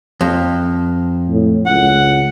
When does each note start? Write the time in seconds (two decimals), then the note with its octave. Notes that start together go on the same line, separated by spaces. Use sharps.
0.21 F2
1.29 A2
1.66 C#2 F#5